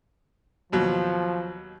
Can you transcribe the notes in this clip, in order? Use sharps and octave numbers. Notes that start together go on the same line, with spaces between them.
D#2 B2 F3 F#3